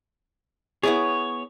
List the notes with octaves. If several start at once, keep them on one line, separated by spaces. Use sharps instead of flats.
B3 E4 G#4 C#5